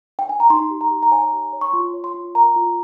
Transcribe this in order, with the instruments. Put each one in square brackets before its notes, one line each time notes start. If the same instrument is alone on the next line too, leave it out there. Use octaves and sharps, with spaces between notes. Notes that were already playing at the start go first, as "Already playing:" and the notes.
[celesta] G5
G#5
A#5
D#4 C6
G4
A#5
G4
A#5
C#5 G#5
G4
C#5
C#6
F4 C6
C#5
C6
F4
A#4 A#5
F4